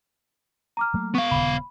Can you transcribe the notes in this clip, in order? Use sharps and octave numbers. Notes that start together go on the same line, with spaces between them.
A#5 D6 F6
F#3 A3 A#3
B3 F5 C#6
D#1 C#3 B5